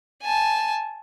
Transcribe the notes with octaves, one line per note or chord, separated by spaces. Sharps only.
G#5 A5